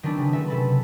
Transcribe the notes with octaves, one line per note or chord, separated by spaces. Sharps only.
D#3 F#3 B3 C4 D4 E4
C#3
A3 B4 E5
C3 A4 B5